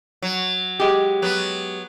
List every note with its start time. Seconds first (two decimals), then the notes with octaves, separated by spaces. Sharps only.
0.22 F#3
0.80 G#3 G4
1.22 F#3 B3